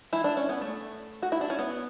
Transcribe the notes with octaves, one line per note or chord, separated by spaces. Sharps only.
E3 E4
D4
C#4
B3
A3
F#4
E4
D4
C#4
B3